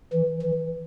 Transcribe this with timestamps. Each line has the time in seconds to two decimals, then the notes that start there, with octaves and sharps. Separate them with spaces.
0.13 E3
0.42 E3